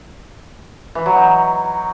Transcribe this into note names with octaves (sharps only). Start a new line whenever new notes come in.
E3
F#3
D#4